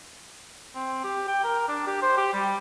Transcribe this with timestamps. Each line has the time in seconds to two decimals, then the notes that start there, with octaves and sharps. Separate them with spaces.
0.75 C4
1.04 G4
1.28 G5
1.44 A#4
1.68 D4
1.87 G4
2.02 C5
2.18 G4
2.33 G3